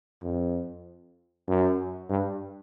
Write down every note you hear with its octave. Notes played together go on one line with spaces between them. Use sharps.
F2
F#2
G2